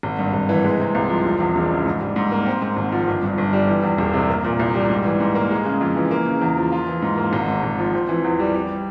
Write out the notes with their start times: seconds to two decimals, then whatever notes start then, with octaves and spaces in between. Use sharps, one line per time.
0.03 G#1
0.19 G2
0.33 G#1
0.49 E3
0.64 G#3
0.79 C3
0.95 C2
1.09 F3
1.25 E1
1.40 E2
1.56 E1
1.70 C#3
1.86 G#2
2.01 G3
2.16 G#2
2.32 A#3
2.46 C4
2.62 G#2
2.77 G#1
2.92 F3
3.07 G1
3.23 G2
3.38 G1
3.53 G3
3.68 E3
3.83 E2
3.98 E1
4.14 C3
4.29 A#3
4.44 A#2
4.59 C2
4.74 G3
4.90 G#2
5.04 E3
5.20 G#2
5.35 A#3
5.50 G#3
5.66 C#3
5.81 F2
5.96 E3
6.11 A#3
6.26 C#3
6.41 E2
6.57 F3
6.72 F4
6.87 E3
7.02 G#2
7.18 A#3
7.33 G#1
7.48 G#2
7.63 G#1
7.79 F3
7.93 C4
8.09 E3
8.24 E2
8.40 G3
8.54 G3